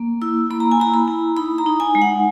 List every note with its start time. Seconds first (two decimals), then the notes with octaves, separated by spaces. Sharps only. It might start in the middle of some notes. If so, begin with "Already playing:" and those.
Already playing: A#3
0.22 E4 E6
0.50 A#3 B5
0.60 A#5
0.71 G#5
0.80 E4 A#5
0.94 B5
1.08 E4
1.37 D#4 B5
1.58 A#5
1.66 D#4
1.80 G#5
1.95 G#3
2.02 F#5